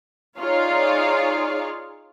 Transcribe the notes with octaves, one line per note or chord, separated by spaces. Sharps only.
D#4 F4 G#4 C#5 D5 F5